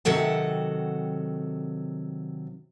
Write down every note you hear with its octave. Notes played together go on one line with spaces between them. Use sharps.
C3 D#3 F#3 A4 F#5